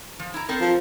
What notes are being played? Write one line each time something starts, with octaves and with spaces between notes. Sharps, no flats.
F3
E4 A#5
C4 A4 A#4
F3